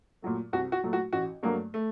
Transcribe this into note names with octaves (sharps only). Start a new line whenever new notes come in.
A#2 F#3 A3
C2 F#4
F#4
A#2 F#3 A3
F#4
A1 F#4
G2 F#3 A3 A#3
A3